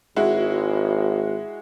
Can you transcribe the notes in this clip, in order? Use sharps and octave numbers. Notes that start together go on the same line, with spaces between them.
G#1 G#3 E4 F#4